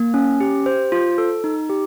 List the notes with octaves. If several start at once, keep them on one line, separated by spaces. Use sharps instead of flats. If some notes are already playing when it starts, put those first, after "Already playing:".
Already playing: A#3
C#4
G4
C5
F4
A4
D#4
G4